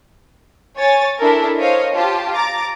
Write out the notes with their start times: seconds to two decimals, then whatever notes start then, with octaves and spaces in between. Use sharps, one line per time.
0.76 C#5 G#5 A6
1.20 D4 E4 A4 A#4
1.58 C5 C#5 D#5 F5
1.93 F4 G4 A5
2.34 A#5 D6 A6